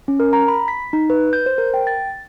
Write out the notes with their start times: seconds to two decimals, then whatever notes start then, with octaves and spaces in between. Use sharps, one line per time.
0.08 C#4
0.20 A#4
0.33 A#5
0.48 B5
0.68 B6
0.93 D#4
1.10 B4
1.33 G6
1.46 C5
1.58 A#4
1.74 G5
1.87 A6